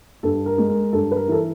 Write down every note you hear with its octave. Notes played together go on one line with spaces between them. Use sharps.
G2 A4
A#4
G#3
A#4
G2 A4
B4
A#4
E3 A4